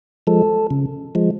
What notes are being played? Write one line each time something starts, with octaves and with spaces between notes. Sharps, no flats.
F3 G#3 A4
C#3
F3 G#3